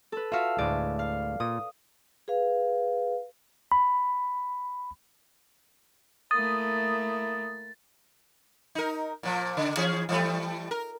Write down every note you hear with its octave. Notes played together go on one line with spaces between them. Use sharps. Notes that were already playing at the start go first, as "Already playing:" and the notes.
A4 B4
F4 F#4 E5 F5
D2 A2 G#3 D5
F5
A#2 D#6
G#4 B4 F5
B5
A3 A#3 E4 D#6 A6
D#4 A#4
A#2 F3
C#3
E3 C#4 G#4
E3 G3 A3
A#4